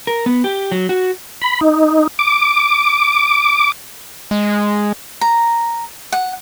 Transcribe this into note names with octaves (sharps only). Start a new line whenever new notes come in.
A#4
B3
G4
F#3
F#4
B5
D#4
D6
G#3
A#5
F#5